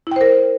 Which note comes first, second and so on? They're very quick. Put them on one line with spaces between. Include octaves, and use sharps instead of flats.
E4 G5 C5 A#4